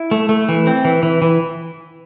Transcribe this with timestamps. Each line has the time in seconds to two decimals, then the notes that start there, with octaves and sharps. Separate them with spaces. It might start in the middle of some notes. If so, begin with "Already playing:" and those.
Already playing: E4
0.11 A3
0.29 A3
0.49 E3
0.67 C4
0.85 E3
1.03 E3
1.22 E3